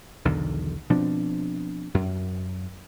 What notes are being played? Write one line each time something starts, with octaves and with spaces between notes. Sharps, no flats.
B1 E2 D3 D#3
B2 F3 C4 D4
F#2